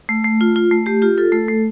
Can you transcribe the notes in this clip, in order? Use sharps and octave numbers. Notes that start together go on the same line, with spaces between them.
A3
A3
F4
F4
A3
A3 G4
F4 G4
F4 A4
A3 A4
A3